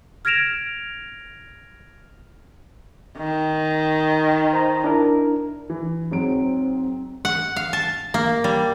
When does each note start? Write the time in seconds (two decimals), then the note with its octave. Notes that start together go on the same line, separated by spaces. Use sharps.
0.25 F6 G#6 A#6 D7 E7 F7
3.17 D#3
4.53 C5 A#5
4.84 D4 E4 A#4
5.70 E3
6.11 G#2 F#3 C4 D7
7.25 F#5
7.56 F5
7.73 A5
8.14 A#3
8.44 G3